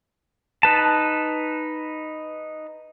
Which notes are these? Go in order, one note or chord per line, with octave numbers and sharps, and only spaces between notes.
D#4 B4 A5